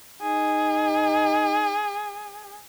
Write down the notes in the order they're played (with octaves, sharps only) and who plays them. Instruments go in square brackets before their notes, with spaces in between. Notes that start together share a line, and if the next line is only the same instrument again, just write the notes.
[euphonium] D#4 [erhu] G#4